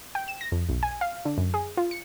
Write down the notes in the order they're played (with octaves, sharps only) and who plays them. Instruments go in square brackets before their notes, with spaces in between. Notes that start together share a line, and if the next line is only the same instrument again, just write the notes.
[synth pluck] G5
E7
A#6
F2
B1
G#5
F5
D3
F#2
G#4
F4
C#7